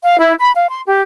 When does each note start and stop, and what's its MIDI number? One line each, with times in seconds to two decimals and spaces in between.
0.02 0.18 77
0.19 0.33 64
0.40 0.51 83
0.54 0.68 77
0.69 0.80 84
0.86 1.01 67